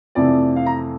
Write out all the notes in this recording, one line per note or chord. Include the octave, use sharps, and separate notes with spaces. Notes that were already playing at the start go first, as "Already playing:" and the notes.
F2 C3 E3 A3 D5
F5
A#5